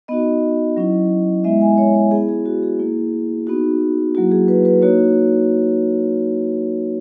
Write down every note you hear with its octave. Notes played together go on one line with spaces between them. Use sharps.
B3 D#4 F#4 D#5
F#3 C#4 E4
G#3 B3 E4 E5
G#5
C#5
C#5
B3 E4 G#4
G#4
F#4
G#4
A#3 E4
B3 D#4 F#4
F#3 A#3 E4 F#4
G#4
B4
B4
A#3 D#4 F#4 C#5